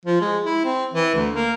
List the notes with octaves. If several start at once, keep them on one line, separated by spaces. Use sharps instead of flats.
F3
G#3
E4
C4
E3
D2
A#3